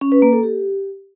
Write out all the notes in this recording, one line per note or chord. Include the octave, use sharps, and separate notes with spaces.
C#4
B4
A#3
A4
G4